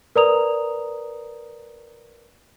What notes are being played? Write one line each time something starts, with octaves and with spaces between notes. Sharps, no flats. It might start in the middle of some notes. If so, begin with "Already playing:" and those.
A#4 B4 D5 A#5 D#6 F7